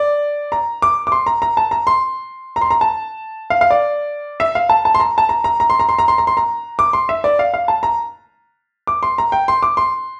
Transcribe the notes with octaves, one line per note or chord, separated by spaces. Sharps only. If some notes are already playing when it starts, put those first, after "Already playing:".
Already playing: D5
A#5
D6
D6
C6
A#5
A#5
A5
A#5
C6
A#5
C6
A#5
A5
F5
F5
D5
E5
F5
A5
A5
C6
A#5
A5
A#5
A#5
A#5
C6
A#5
C6
A#5
C6
A#5
C6
A#5
D6
C6
E5
D5
F5
F5
A5
A#5
D6
C6
A#5
G5
C6
D6
C6